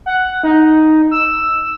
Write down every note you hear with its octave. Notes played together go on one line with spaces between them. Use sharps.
F#5
D#4
E6